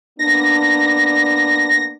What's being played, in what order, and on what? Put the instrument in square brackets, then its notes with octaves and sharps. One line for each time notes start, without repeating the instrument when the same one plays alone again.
[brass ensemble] A#3 B3 D4 [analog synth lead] A#6